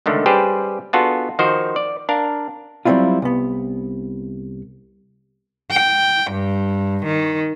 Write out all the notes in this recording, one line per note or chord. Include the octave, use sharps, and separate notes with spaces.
C#2 D3 D#3 A3
G3 C#4 G4 G#4 B4 C5
B3 D4 F4 F#4 G#4 A4
D#3 F3 F#4 C5
D5
D4 A#4 F5
F#3 G3 C4 D4 E4 F4
C2 B3
G5
G2
D#3